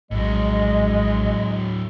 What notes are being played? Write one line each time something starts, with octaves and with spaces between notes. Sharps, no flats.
A#1 A2 F#3 G#3 D#5